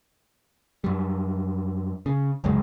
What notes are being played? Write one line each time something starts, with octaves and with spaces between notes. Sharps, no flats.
F#2 G3
C#3
F1 C#2 F#2 G#3